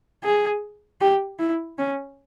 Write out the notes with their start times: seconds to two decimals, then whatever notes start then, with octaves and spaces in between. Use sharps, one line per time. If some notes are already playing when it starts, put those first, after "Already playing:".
0.24 G#4
1.01 G4
1.39 E4
1.78 C#4